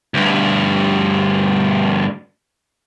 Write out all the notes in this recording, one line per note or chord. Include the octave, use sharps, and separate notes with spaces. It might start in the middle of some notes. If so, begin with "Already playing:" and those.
D2 G2